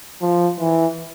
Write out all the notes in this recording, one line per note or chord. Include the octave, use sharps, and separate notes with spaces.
F3
E3